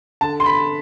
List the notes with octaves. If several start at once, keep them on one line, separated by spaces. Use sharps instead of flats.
D3 A5
C6
B5